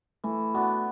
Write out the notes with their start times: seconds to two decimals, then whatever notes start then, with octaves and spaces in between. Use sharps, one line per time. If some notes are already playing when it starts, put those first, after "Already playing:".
0.24 E3 A3
0.54 B3 D4 F#4